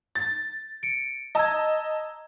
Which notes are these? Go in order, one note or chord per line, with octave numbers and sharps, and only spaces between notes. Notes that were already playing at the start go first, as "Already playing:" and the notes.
A6
C#7 D7
D#5 A5 A#5 E6 G#6